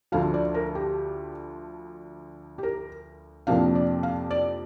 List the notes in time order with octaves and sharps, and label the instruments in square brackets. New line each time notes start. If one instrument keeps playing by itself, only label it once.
[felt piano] D2 D3 F3 F5
D5
A#4
G4
G4
A#4
F2 C3 F3 A#3 D4 F5
D5
F5
D5